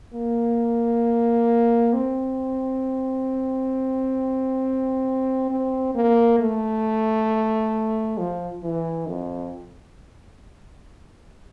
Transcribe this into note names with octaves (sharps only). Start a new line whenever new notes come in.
A#3
C4
C4
A#3
A3
F3
E3
F2